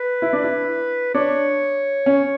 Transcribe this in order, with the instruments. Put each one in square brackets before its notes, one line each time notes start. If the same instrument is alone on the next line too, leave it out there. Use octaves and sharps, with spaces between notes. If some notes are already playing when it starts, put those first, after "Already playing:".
Already playing: [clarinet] B4
[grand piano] E4
D4
E4
[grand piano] D4 [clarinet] C#5
[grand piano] C#4